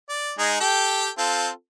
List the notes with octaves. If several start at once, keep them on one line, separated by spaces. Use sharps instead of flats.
D5
G#3 D#4 G#4
G4 A4 G5
C4 F4 A4